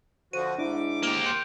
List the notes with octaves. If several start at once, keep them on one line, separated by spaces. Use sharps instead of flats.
D3 F3 F#4 C5 D#7
G#2 D4 E4 D6
A#3 G4 D7 F7
C6 G6 C#7